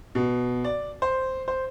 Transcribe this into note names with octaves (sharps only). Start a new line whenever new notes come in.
B2
D5
C5
C5